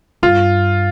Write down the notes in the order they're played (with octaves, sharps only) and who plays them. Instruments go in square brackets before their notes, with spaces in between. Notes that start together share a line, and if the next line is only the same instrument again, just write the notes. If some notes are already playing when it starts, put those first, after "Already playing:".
[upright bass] G2 [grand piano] F4